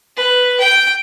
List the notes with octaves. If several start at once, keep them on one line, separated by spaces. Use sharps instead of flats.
B4
G5